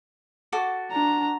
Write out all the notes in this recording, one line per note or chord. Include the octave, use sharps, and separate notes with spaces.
F#4 A4 D6
D4 A#5